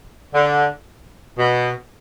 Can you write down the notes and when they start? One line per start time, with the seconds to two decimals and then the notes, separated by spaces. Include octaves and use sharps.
0.33 D3
1.38 B2